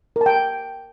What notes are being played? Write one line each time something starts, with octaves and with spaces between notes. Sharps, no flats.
A#4
A5
G5